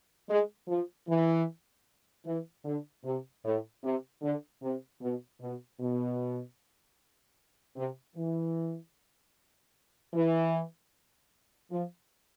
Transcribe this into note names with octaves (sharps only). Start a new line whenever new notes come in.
G#3
F3
E3
E3
D3
C3
A2
C3
D3
C3
B2
B2
B2
C3
E3
E3
F3